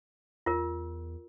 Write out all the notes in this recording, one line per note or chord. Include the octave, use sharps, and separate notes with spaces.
E2 F4 A#4